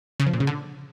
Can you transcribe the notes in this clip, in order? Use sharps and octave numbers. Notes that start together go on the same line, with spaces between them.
C#3
F3
A#2
C#3
D3